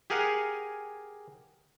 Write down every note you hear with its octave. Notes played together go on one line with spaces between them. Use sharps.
G4 G#4 A#4 F5 F#5 G#5